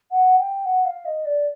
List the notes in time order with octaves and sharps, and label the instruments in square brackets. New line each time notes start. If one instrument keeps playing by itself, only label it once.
[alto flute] F#5
G5
F#5
F5
D#5
D5